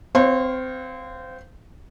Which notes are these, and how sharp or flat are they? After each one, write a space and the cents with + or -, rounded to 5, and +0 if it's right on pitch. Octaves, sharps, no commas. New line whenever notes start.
C4 -20 C#5 -45 F5 +0